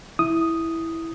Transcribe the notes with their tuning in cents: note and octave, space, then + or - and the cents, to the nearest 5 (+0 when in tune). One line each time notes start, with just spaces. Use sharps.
E4 -5 D#6 +0